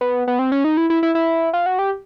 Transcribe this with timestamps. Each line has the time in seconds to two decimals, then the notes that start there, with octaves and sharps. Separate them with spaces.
0.01 B3
0.28 B3
0.39 C4
0.52 C#4
0.64 D#4
0.77 E4
0.90 E4
1.03 E4
1.15 E4
1.53 F4
1.66 F#4
1.79 G4